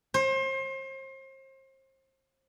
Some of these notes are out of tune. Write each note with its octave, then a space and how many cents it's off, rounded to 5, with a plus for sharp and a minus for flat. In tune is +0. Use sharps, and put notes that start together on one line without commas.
C5 +35